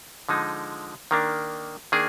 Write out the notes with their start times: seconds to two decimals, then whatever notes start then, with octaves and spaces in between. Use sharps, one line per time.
0.29 D3 F3 G#3 D#4
1.11 D#3 A#3 D4
1.92 D#3 A#3 D4 G#4